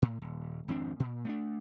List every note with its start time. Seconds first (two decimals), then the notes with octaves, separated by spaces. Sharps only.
0.02 A2
0.22 D#1
0.68 G#1 F2 C4 D4
1.00 A#2
1.25 A3 A#3 D4